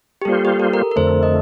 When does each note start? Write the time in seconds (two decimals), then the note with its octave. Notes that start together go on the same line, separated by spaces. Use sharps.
0.22 G4
0.25 G3 A#3 F4 A4 C5
0.45 G4
0.60 A4
0.73 A#4
0.91 A#4
0.96 F2 D3 A3 C5
1.23 D#5